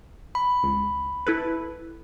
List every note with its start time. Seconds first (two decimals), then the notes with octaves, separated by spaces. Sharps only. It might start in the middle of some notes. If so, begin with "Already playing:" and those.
0.35 B5
0.63 C#2
1.27 E4 A4 B4